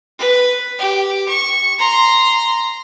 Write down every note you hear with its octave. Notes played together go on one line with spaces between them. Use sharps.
B4
G4
C#6
A#5 C6